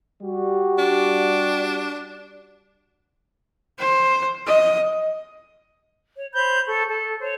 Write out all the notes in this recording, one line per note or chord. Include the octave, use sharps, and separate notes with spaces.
G3 F#4
D4
C5
D#5
C#5
C5 C#5 B5 G6
A4 C#6
A4
C5 C#5